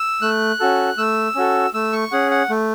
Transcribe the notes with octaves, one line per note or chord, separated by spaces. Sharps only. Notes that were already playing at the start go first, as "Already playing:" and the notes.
Already playing: E6
A3 F#6
C#4 F#4 A4
A3 E6
C#4 F#4 A4
A3 E6
C#6
C#4 G#4 F#5
F#5
A3